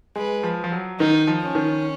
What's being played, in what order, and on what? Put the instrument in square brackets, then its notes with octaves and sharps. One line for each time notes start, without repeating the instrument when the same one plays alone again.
[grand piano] G#3 [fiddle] B4
[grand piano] F3
F3
F#3
[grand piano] D#3 [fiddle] D#4
[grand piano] F3
[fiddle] C#4
[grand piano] D#3